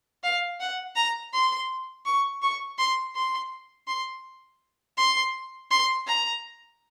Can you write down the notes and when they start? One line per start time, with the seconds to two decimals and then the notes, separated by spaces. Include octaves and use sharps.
0.23 F5
0.60 F#5
0.96 A#5
1.33 C6
2.05 C#6
2.42 C#6
2.78 C6
3.15 C6
3.87 C6
4.97 C6
5.71 C6
6.07 A#5